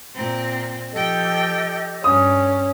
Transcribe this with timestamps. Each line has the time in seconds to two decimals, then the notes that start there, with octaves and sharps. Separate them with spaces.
0.15 A#2 C4 A#5
0.92 F3 G4 A4 D#5 G5
2.04 G2 C#4 D#6